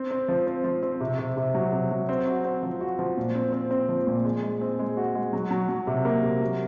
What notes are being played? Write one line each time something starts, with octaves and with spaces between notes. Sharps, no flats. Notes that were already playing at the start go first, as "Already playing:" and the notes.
Already playing: C4
C4
F3
C4
F3
C4
C3
C3
C3
F#3
C3
F#3
C4
F#4
C4
F3
F#4
F3
A#2
C4
C4
C4
F3
A#2
G#3
G#3
C4
G#3
F#4
G#3
F#3
F#3
F#3
C3
A#3
C3
F#3